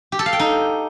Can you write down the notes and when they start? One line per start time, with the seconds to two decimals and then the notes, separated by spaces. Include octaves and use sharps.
0.12 G4
0.19 A4
0.26 F5
0.33 G5
0.39 D#4